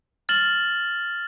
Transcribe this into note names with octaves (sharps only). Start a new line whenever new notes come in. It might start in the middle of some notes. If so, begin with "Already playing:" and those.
F6 A6 E7 F#7 G7